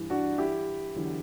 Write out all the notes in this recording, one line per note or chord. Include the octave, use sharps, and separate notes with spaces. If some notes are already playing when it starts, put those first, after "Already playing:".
Already playing: G2 E3
D4 F#4
E4 G4
E2 D3 F#3